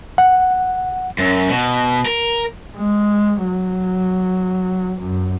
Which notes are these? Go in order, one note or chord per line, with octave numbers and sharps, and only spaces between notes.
F#5
F#2
B2
A#4
G#3
F#3
F#2